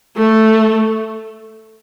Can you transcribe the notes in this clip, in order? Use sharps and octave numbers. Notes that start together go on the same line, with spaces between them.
A3